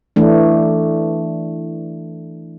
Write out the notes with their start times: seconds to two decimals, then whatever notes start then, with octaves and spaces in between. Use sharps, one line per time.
0.16 E3 A3 D4